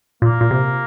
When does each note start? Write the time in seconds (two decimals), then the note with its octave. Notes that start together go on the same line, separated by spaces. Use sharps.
0.22 A#2 A#3
0.41 A#2
0.51 C3